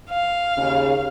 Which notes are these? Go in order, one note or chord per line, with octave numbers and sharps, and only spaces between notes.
F5
D#2 C#3